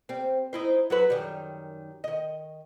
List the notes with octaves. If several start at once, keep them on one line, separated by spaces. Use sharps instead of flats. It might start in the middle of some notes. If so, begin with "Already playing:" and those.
G3 C4
D#4 E4 C5
F#3 F#4 B4
F#2 D#3 G3
D#3 D#5